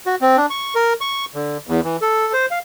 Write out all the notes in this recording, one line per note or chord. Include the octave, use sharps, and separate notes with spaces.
F#4
C4
D4
C#6
A#4
C#6
D3
E2
E3
A4
C5
F5